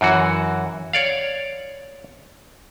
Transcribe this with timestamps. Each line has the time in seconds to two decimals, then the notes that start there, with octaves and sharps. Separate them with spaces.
0.01 F#2 E3 F#4
0.93 C#5 D5 F5